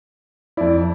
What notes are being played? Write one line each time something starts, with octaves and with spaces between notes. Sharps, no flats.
F2 E4 D5